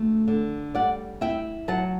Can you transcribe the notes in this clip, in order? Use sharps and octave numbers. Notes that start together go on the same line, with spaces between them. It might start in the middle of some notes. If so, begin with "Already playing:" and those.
Already playing: D2 A3
D3
G3 D5 F#5
E4 E5 G5
F#3 F#5 A5